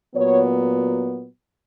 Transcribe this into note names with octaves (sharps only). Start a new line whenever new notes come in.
A#2 F#3 B3 C#5